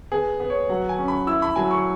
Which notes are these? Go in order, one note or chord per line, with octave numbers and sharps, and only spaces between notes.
B3 G#4
B3
C#5
F#3 F#5
G#5
C#4
B5
E4 E6
B5
F#3 G#5
C#6